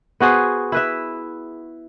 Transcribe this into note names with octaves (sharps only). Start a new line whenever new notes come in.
B3 F#4 G#4 C5
E4 B4 E5